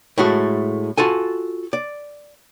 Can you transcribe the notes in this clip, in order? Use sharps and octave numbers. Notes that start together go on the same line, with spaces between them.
A2 G#3 A3 F#4
F4 F#4 A4 G#5
D5